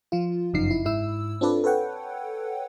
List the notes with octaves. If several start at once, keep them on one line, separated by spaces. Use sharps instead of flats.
F3 F4
G1 F#2 C#3 F3 D#4 C7
E4
G#2 E4 E6
C4 D4 F4 A4 B4 D5
A4 B4 C#5 F#5 G5